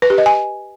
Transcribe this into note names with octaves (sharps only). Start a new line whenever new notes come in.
B4
G4
D#5
G#5